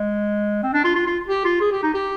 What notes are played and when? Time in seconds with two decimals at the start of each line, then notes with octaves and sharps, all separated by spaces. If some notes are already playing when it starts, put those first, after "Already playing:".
Already playing: G#3
0.63 C4
0.73 D4
0.84 F4
0.95 F4
1.07 F4
1.28 G4
1.44 F4
1.60 G#4
1.72 G4
1.83 D#4
1.94 G4